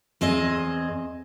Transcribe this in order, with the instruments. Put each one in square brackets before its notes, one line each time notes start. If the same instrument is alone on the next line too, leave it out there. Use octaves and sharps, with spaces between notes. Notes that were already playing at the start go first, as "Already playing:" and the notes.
[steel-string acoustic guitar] E2 C4 G#4 D#5